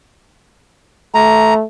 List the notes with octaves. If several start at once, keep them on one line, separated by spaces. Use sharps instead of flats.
A3 A#5